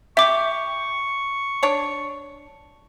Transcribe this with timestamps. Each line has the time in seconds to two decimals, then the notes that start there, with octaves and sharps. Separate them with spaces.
0.17 G4 E5 C#6 D6
1.63 D4 C#5